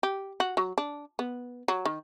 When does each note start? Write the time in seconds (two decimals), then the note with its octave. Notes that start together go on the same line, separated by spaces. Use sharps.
0.03 G4
0.40 F#4
0.57 F#3
0.78 D4
1.19 B3
1.68 F#3
1.85 D#3